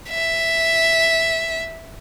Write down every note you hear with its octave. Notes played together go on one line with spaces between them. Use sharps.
E5